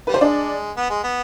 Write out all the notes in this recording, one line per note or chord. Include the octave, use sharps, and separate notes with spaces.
G3 B4
C5
G#3 D4 D5
B3
G#3
B3